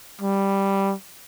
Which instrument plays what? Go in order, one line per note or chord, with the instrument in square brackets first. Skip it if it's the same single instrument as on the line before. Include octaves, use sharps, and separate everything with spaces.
[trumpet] G3